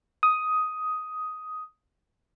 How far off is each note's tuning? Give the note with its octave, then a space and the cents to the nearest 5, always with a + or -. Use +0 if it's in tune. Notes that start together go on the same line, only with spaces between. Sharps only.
D#6 +10